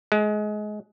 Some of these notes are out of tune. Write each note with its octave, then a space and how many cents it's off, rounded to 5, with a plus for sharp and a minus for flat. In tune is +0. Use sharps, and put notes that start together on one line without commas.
G#3 +25